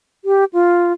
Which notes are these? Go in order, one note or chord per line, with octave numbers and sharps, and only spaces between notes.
G4
F4